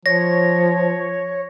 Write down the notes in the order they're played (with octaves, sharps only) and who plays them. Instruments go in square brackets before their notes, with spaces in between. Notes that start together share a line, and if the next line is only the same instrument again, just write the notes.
[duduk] F3 [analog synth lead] C#5 [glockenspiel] A#6